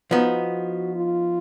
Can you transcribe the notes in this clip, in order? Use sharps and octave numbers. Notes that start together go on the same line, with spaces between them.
F3 B3 D#4 F#4
F4